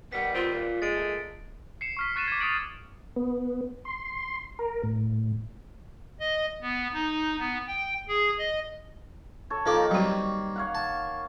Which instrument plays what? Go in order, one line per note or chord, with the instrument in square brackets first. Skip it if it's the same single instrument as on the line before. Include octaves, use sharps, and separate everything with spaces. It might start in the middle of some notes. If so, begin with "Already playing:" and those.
[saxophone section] D#3 G3 B3 [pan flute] F#5 [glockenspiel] B6
[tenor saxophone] C4 [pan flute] F4
[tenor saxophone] A#2
[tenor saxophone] G#3 [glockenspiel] A6 D7
[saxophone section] A#2 A3
[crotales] C7 C#7 E7
C#6 F6 B6
C#6 F#6 A6 C7 D#7 E7
D6 G#6
D#6 G#6 A6 C#7 D7 F#7
[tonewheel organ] B3
C6
A#4
A2
[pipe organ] D#5
B3
D#4
B3
G5
G#4
D#5
[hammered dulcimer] A4 C#5
[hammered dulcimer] D#3 A#3 [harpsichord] F3 A4 D6
[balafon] F#3 F#4 [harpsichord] G3 C4
[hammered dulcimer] C#5 F5 F#5
[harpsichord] A5